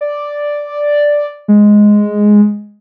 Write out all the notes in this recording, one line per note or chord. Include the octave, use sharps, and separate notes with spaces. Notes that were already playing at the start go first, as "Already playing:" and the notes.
D5
G#3